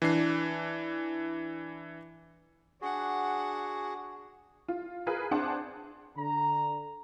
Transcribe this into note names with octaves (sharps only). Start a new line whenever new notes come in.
E3 D4 C7
D4 F#4 G#4 F#5
F4
F4 G#4 A#4 B4
C4 D4 G#4 C5 F#5 A5
D3 A#5